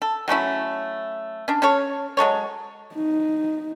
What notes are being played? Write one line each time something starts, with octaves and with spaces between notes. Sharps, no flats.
A4
F#3 A3 C#4 E4
C#4 D4
C#4 A4 C#5
F#3 G#3 A4 C#5
D#4